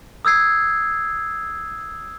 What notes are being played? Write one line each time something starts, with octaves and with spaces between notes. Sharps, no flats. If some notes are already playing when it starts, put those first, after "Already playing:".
D#6 E6 G#6 C7